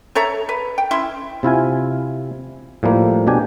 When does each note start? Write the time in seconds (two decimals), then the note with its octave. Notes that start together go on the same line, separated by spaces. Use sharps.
0.15 A4 C#5 E5 A#5
0.49 B4
0.78 G5
0.91 C#4 E4 E5 C6
1.43 C3 E4 F4 G#5
2.83 A2 F3 G3 A#3
3.27 B2 D4 G4 G#5